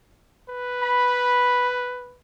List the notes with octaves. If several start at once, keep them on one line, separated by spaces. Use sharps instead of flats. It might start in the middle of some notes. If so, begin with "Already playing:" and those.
B4
B5